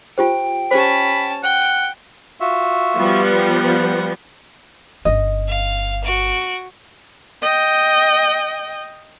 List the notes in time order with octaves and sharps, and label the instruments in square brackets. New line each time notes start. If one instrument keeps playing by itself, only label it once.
[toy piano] F4 G4 C5 [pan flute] G5
[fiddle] C#4 A5 [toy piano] G4 C5 [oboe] B5
[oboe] F#5 [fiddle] G5
[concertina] F4 F#4 E5
[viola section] F3 G3 B3
[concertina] F#5
[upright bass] G1 C#4 [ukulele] D#5
[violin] F5
F#4 D7
[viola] D#5 G5